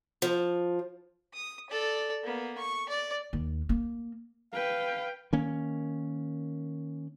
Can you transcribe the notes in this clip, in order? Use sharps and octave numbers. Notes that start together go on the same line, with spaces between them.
F3
D#6
A4 D5
A#3 B3
C#6
D5
D#2
A#3
B4 F5 G5
D#3 A#3 C#4